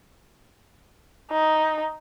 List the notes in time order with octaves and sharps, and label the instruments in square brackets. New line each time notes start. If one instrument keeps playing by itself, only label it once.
[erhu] D#4